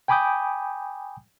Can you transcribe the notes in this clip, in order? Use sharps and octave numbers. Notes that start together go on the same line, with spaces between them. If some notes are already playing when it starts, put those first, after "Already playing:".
G5 G#5 B5 D6 D#6 G6